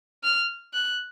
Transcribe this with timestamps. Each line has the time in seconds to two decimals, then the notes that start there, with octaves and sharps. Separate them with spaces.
0.24 F6
0.73 F#6